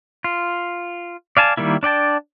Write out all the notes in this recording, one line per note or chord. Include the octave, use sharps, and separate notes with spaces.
F4
D5 F5 G#5 A5
D#3 G3 A#3 E4
D4 D5 G5 A5